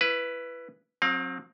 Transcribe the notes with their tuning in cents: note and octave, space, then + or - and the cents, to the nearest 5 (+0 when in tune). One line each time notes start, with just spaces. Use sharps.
E4 +25 B4 +0
F#3 -25 C4 +25 F5 +30